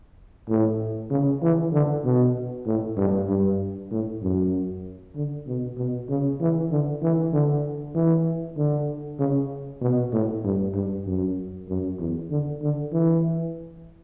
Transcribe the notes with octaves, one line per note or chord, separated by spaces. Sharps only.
A2
C#3
E3
D3
B2
A2
G2
G2
A2
F#2
D3
B2
B2
C#3
E3
D3
E3
D3
E3
D3
C#3
B2
A2
G2
G2
F#2
F#2
E2
D3
D3
E3